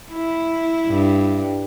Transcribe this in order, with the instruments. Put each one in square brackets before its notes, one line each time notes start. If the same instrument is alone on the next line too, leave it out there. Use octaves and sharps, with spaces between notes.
[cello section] E4
[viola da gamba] G2